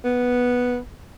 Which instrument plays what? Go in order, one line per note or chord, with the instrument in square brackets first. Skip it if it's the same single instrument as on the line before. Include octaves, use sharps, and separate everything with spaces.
[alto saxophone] B3